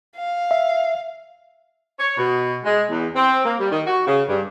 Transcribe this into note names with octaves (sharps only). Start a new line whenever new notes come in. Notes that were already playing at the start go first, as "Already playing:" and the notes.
F5
E5
C#5
B2
G#3
E2
C4
A#3
G3
D#3
F#4
C#3
G2